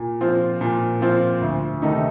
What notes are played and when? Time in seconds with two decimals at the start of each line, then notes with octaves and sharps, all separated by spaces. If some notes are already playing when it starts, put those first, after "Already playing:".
Already playing: A#2
0.21 F3 C4 F4
0.61 A#2
1.01 F3 C4 F4
1.41 D2
1.82 C3 D#3 A3 D#4